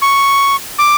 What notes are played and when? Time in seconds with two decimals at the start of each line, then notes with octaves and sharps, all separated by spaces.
0.02 C#6
0.79 D6